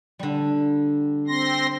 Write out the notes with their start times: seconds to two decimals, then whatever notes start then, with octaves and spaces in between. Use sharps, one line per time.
0.19 D3 G3
1.28 C4 C6 A#6